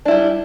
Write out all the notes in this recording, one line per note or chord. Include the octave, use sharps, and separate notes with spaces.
G3 D4 E4